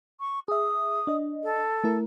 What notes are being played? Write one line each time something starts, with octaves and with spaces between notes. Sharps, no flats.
C#6
G#4 E5 D#6
D4 D#5
A4
A3 E4 A#4